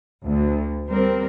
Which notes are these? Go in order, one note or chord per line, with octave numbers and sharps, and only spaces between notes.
D2
G3 C4 A#4